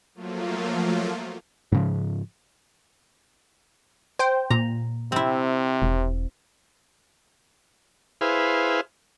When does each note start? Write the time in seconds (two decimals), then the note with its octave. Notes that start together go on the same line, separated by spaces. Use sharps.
0.15 F3 F#3 A3 A#3 F4
1.72 G#2 C#3 F3
4.19 C5 G5
4.50 A#2 A#5
5.12 C3 C4 E4
5.82 E1
8.21 E4 G#4 B4 C5 F5